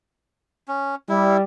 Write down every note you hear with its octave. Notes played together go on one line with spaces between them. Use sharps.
C#4
G3 E4